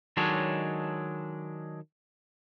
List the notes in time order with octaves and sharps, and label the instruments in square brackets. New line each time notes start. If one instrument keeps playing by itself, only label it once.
[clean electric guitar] D#3 F#3 G#3 D4 A4 C#5